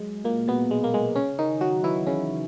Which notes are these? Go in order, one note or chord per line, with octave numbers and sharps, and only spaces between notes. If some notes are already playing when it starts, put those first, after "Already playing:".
Already playing: F#3 G#3
A#2 A#3
B2 B3
G#3
A#3
G#3
C#3 C#4
D#3 D#4
F#3 F#4
E3 E4
C#3 C#4